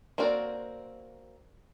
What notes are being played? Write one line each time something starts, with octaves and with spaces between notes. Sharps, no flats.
A#3 C4 F#4 A#4 D5